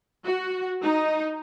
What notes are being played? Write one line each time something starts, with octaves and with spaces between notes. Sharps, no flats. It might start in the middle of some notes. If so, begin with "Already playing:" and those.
F#4
D#4